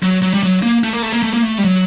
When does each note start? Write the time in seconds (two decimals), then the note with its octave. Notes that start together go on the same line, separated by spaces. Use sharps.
0.03 F#3
0.22 F#3
0.34 G3
0.43 F#3
0.62 A#3
0.84 A3
0.93 A#3
1.02 A3
1.12 A#3
1.23 A3
1.33 A#3
1.43 A3
1.58 G3
1.64 F#3